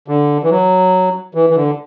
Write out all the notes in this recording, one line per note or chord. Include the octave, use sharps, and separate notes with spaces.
D3
E3
F#3
E3
E3
D3